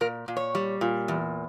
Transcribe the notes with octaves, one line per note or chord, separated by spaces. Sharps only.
A#2 A#4
A#2
C#5
G3
A#2
E2